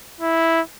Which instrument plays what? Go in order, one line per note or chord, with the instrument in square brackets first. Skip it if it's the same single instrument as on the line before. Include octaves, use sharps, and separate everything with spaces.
[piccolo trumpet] E4